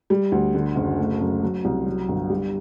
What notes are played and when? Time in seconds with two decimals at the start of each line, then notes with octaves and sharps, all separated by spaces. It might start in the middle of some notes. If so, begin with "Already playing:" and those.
0.10 G3
0.32 D2
0.55 D3
0.76 F#1
0.99 A3
1.20 F#2
1.43 F#3
1.65 C2
1.87 F#3
2.09 G1
2.30 G3